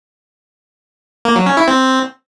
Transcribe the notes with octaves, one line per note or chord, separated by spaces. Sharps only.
A#3
F#3
C#4
E4
C4